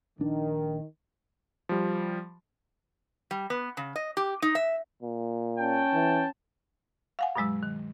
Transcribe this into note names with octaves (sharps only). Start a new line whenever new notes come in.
A#1 D#3 D4
F3 G3
G3
B3
C#3
D#5
G4
D#4
E5
A#2
C#4 G5 A5
E3
F5 F#5 G#5
G2 B2 F#3 G#3 E6
D#3